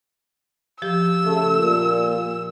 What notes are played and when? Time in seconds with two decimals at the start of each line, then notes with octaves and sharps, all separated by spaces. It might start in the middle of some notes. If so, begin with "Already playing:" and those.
0.82 F3 G4 E6
1.25 C#3 A3
1.56 A#2